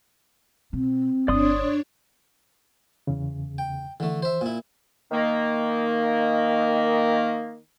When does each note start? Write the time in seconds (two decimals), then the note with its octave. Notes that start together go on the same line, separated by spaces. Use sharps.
0.73 B2 C4
1.28 G1 D4 C#5 D5 C6 D#6
3.07 E2 C#3
3.58 G5
4.00 D3 E3 A3
4.22 C5 E5
4.41 A#2 E4
5.11 D#3 A#3